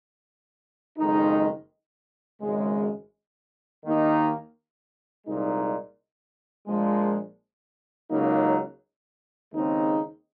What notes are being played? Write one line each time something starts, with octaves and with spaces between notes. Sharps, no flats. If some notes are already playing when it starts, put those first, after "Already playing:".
F#1 F2 D#3 G#3 D#4
G#1 F#2 C#3 G#3
D#2 D#3 A#3 D#4
C2 A#2 G#3 D#4
A#1 A#2 F3 G#3
C#2 C#3 F#3 A#3 D#4
D#2 C#3 G#3 C4 D#4